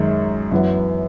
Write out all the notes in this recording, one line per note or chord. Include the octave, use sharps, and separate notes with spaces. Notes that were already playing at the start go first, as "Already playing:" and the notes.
Already playing: F#2 D#3 G#3
F#2 E3 B3 F#4